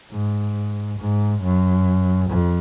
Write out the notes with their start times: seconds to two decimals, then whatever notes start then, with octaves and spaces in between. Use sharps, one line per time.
0.12 G#2
0.99 G#2
1.42 F#2
2.30 F2